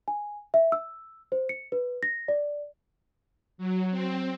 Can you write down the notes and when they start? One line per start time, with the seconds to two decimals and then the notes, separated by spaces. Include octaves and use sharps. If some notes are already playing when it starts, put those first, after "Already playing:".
0.08 G#5
0.54 E5
0.72 E6
1.32 C5
1.49 C#7
1.72 B4
2.03 A#6
2.28 D5
3.58 F#3
3.91 C4